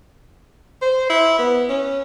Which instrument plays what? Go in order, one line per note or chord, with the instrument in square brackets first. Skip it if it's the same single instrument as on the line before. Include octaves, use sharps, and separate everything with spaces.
[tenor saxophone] C5
E4
B3
C#4